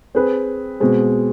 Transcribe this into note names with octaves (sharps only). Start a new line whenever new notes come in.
C4 G#4 B4
B2 G#3 C4